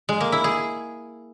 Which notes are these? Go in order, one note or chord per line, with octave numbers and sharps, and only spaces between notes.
G#3
A#3
E4
G#4